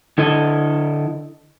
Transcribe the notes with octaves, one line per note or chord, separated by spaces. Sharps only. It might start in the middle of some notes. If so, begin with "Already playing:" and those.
D3 E4 A4 D#5